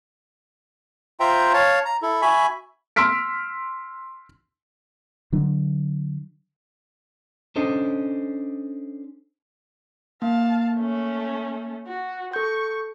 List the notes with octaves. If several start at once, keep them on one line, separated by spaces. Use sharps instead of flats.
F4 C5 E5 G5 A#5
C#5 F5 A5
A#5
E4 A4
F#4 E5 G#5 B5
C6 E6 F6 B6 D7
D3 F#3 D4
C#4 D4 A4 C5 D#5
A#3 F5 A5
A3 C#4
F#4
A4 C#6 G6